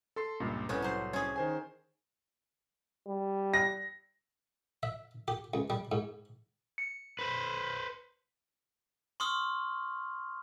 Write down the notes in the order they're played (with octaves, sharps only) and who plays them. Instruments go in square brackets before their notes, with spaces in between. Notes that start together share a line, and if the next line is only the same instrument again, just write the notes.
[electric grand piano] A4 C6 C7
C#2 G2 A#2
[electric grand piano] C2 [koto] A2 B3 C#4
[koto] F#3 C5
C#4 G#4
[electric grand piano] D#3 C5 G#5
[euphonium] G3
[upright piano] A#6
[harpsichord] E5
G4
C#2
G3
G#2
[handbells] C#7
[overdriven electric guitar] B4 C5
[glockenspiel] C6 C#6 D#6 F6